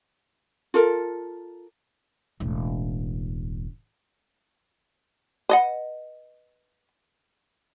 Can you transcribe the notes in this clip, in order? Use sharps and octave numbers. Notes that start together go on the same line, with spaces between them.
F4 A4 A#4
E1 A1
B4 D#5 F#5